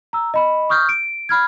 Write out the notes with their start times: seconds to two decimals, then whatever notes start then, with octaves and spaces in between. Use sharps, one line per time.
0.13 A#5 E6
0.34 D#5 B5
0.69 C#6 D#6 F6 G6
0.89 D7
1.29 B5 F6 G#6